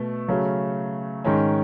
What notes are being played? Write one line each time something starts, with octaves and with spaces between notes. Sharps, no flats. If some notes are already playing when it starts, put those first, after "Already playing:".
Already playing: B2 A3
C#3 F#3 A3 C#4
G#2 D#3 G#3 C#4